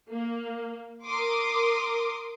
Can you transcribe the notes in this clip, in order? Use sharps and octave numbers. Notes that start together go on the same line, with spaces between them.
A#3
A#4 C6 D6 D#6